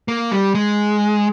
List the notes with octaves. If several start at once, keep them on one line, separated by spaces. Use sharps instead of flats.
A#3
G3
G#3